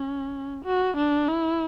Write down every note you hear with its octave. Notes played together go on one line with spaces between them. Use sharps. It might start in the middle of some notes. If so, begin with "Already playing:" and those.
Already playing: C#4
F#4
D4
E4